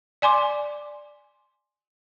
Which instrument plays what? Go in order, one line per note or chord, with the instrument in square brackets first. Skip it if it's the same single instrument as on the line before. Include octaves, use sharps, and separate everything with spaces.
[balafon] D5 G#5 C6 D6